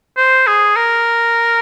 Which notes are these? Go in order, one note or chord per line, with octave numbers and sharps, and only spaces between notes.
C5
G#4
A#4